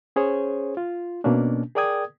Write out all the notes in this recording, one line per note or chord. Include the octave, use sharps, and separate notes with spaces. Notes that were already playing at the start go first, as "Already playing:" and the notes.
C#4 G#4 C5 C#5
F4
B2 A#3 C#4 D4
G#4 A#4 D5 G5 D#6 G#6